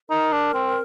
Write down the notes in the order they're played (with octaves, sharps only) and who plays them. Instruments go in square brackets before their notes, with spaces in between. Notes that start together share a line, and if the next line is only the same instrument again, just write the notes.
[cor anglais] D#4 [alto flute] A#4
[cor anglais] D4
C4